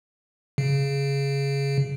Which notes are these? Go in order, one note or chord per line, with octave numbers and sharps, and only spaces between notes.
C#3